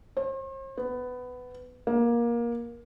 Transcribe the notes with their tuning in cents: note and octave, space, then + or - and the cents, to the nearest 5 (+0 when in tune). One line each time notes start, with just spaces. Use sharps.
C5 +45
B3 +15
A#3 +20